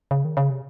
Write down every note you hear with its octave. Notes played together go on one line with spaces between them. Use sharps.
C#3
D#3
C#3
C3